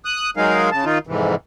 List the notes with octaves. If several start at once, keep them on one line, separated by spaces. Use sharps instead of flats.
D#6 F#6
F#3 G#3 D#4 G#4 A#4 F5
C#3 A5
D#3 D#4 F4
F2 G#2 C3 E3